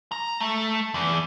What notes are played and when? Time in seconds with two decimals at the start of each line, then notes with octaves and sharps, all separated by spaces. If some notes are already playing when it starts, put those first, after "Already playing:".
0.12 A#5
0.41 A3
0.94 E2